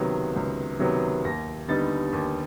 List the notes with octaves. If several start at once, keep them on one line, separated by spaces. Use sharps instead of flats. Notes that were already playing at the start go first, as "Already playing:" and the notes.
Already playing: C#2 C3 D#3 F#3 B3
C#2
C3 D#3 F#3 B3
D#2 A#6
D3 G3 B3 D#4 A6
D#2